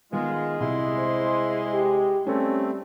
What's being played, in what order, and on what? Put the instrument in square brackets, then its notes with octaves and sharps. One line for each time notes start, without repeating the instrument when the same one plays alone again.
[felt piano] D#3 B3 [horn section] G#3 [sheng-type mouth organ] F4
[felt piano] C2 [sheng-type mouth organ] E4 C6
[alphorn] C5
G4
[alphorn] G3 [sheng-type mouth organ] A3 C4 [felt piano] C#4 A4 B4